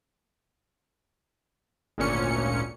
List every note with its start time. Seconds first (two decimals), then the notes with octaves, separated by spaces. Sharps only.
1.98 G#1 D2 A#2 C#4 C#7